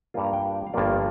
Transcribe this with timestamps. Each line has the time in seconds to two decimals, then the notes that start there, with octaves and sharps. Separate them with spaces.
0.14 G2 G3 A#3 F4
0.24 A#5
0.33 G5
0.67 F5
0.74 G1 G2 F3 A#3 F4 D5